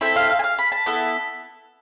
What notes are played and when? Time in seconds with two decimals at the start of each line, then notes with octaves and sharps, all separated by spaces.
0.01 C4 E4 A4 E5
0.16 F5
0.29 F5
0.39 G#5
0.44 F5
0.58 B5
0.72 A5
0.86 B3 E4 A4